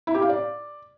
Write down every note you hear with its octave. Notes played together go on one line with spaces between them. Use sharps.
E4
G4
F5
D5